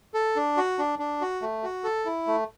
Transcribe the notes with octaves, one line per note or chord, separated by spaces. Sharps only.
A4
D4
F#4
D4
D4
F#4
A3
F#4
A4
E4
A3